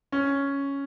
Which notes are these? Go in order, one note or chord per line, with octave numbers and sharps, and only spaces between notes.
C#4